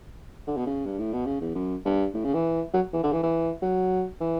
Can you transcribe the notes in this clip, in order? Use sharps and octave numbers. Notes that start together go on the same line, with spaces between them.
D3
B2
C#3
G2
A2
B2
C#3
E2
F#2
G2
A2
C#3
E3
F#3
E3
D3
E3
E3
F#3
E3